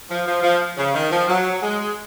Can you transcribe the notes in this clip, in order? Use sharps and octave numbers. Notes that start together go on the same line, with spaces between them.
F3
F3
F3
C#3
D#3
F3
F#3
G#3